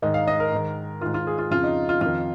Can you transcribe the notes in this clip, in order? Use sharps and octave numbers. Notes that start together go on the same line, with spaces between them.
G#2 D#3 D#4
F5
D#5
A#4
G#2 D#3
G#2 D#3 F4
F4
G#4
F4
F2 C#3 F4
D#4
F4
F2 D#3 F4